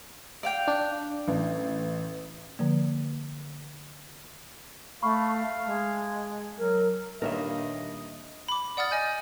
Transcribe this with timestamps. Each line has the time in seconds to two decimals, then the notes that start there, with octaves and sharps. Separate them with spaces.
0.43 D5 F5 G5
0.68 D4
1.28 A1
2.59 D3 F3 A#3
5.02 A3 F5 B5 C#6
5.35 A5
5.66 G#3
6.58 F#3 A#4
7.22 G2 A#2 D#3 A#3 A#4 C#5 D#5 E5
8.48 B5 D6
8.77 D5 F#5 D#6 F6 A6
8.91 D#5 G#5 G6